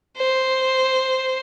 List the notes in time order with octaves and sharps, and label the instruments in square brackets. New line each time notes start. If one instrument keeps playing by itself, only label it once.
[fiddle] C5